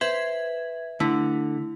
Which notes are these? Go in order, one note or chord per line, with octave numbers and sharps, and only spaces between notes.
B4 C5 E5 G#6
D3 A3 E4